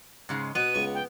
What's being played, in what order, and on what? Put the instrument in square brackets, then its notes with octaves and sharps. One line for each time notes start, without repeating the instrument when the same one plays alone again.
[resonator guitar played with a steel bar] G#2 C#3 G#3
[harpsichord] B2 [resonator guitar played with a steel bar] B3 [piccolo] D#7
[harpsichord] C#2 C#6
[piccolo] G5